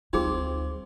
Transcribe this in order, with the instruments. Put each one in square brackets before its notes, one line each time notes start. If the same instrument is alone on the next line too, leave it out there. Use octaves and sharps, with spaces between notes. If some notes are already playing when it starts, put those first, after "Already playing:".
[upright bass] D2 G3 [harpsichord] C4 F4 [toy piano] D#4 G#4